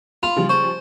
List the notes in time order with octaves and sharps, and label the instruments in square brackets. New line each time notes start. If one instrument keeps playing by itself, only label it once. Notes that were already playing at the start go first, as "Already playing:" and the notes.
[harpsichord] F4 [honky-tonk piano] B5 [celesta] F7
[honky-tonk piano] C#3 F3 G3
[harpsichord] C5 [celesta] C#6